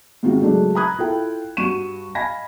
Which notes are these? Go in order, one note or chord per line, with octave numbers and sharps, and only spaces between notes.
G#2 C3 D#3 F4 F#4
C#3 F#3 G#3 A3 D4
A#5 B5 D#6 F#6 G#6
E4 F4 A4 G5
G2 F#4 C#6 D#7 E7
D#5 F5 G#5 B5 G#6 A#6